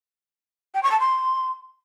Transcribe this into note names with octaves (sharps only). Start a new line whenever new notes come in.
G5
C#6
A5
C6